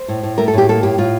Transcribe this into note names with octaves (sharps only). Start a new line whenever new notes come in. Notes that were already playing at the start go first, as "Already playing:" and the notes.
Already playing: C5
A2
A2
A3 A#4
A4
A2 G4
A#3 A4
A2 G4
A2 F4